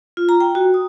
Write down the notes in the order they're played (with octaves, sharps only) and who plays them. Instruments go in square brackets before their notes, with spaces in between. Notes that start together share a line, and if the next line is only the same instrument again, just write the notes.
[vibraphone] F4
A#5
G5
F#4
D#6